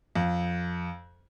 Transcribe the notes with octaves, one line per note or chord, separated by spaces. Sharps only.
F2